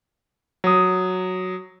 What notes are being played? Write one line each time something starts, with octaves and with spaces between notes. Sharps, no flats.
F#3 D#6